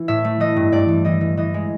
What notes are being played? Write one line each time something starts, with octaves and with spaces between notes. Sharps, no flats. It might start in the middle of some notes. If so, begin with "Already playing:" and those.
Already playing: E3
A2 E5
A3
E3 D#5
G2
G2 D5
E3
E3 D#5
E3
E3 D#5
G#3